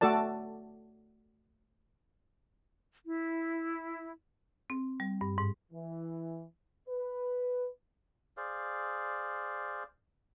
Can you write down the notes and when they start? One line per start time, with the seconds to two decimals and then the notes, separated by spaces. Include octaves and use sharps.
0.01 A3 F#4 A4 D5 A5
3.05 E4
4.70 C4
5.00 G3
5.21 G2
5.38 G#2
5.72 E3
6.88 B4
8.37 G#4 C5 D5 F5